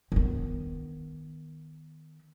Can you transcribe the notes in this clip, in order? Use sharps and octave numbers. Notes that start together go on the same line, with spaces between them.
D#3 B3